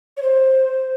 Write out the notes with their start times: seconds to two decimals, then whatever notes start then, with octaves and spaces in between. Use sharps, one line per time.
0.17 C#5
0.22 C5